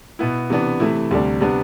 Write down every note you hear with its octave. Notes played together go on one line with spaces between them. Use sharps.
B2 B3 E4
C3 E3 B3 D4
C3 E3 A3 E4
D2 C3 G3 D4
C3 G3 B3 D4